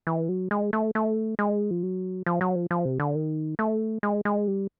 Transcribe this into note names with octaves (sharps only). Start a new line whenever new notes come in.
E3
F#3
G#3
A3
A3
G#3
F3
F#3
F3
F#3
F3
F3
C3
D3
D#3
A3
G#3
G#3
G3